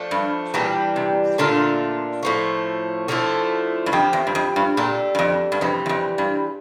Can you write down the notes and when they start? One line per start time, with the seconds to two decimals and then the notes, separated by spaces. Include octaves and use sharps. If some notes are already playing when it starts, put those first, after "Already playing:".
Already playing: F3 A3 D4
0.11 G2
0.54 A#2 E3 G3 D4 G4
0.96 C3
1.38 A#2 D3 A3 D4 F4
2.23 A2 F3 A3
3.08 D3 F3 A3 E4
3.86 G2
3.92 F2 F3 C4 G4
4.13 E2
4.27 G2
4.35 F2
4.56 G2
4.77 A#2 G3 D4 A4
5.15 G2
5.19 F2
5.52 G2
5.61 F2 C3 E3 G3
5.86 E2
5.89 F2
6.18 G2